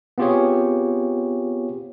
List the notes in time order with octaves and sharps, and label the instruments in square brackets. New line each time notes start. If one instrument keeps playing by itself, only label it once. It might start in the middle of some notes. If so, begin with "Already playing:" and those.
[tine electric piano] B3 C4 F4 G4 G#4 C#5